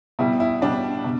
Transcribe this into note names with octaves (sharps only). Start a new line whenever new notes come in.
B2 G3 E4
E4
B2 G3 D4
B2